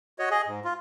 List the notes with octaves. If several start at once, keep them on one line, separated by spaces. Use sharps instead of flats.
F#4 C#5 D#5
G#4 D#5
G#2
F4